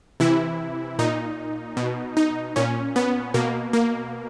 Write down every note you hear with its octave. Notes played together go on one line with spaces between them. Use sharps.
C3 E3 E4
A#2 D#4
B2
D#4
A#2 C#4
B3
B2 A#3
A#3